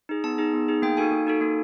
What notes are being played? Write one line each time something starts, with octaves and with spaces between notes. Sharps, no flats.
D#4 G#4
B3 A5
D#4 G#4
B3
D#4 G#4
A#3 G5
D#4 F#4 A4 G#5
A#3
D#4 F#4 A4
A#3